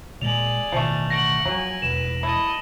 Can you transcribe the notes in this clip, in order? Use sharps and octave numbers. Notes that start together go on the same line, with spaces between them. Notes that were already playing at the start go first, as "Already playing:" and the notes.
A#2 G#3 G#4 D5 F7 F#7
A1 B2 D#3 F3 A3
F#5 C#6 A#6 D7 F#7
F#2 F3 F#3 C#5 G#5
E1 B4 E7
E4 A4 D#5